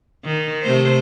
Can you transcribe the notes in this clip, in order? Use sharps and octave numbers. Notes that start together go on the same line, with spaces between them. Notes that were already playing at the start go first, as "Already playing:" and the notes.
D#3
C3 A3 C5